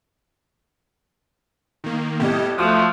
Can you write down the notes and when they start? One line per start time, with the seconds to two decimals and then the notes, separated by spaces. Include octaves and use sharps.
1.84 D#3 A#3
2.20 A2 G3 B3 G4 D#5
2.58 F3 A3 F#4 D#6